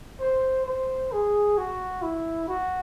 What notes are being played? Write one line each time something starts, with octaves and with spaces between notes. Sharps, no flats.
C5
C5
G#4
F#4
E4
F#4